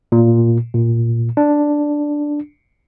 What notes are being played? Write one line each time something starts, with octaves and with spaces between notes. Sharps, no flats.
A#2
A#2
D4